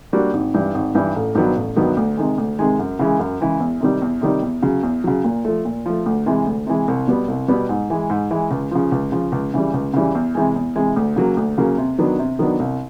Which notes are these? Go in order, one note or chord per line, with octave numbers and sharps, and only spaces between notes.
G3 A#3 D4 F#4
G#1
G2 E3 G3
G#1
G2 E3 G3
A1
G2 D#3 F#3 B3
A1
G2 D#3 F#3 B3
D2
C3 D#3 G#3
D2
C3 D#3 G#3
F#2
C#3 E3 G#3
F#2
C#3 E3 G#3
E2
C3 D#3 G3
E2
C3 D#3 G3
E2
C#3 F#3
E2
C#3 F#3
A#2
F3 A3
A#2
F3 A3
D2
C3 E3 G#3
D2
C3 E3 G#3
C2
B2 G3 B3
C2
B2 G3 B3
G#2
E3 G#3
G#2
E3 G#3
C#2
C#3 F3
C#2
C#3 F3
C#2
C#3 E3 G3
C#2
C#3 E3 G3
E2
C3 E3 G#3
E2
C3 E3 G#3
D2
C#3 F#3 A#3
D2
C#3 F#3 A#3
C3
D#3 F#3 B3 D4
C3
D#3 F#3 B3 D4
C2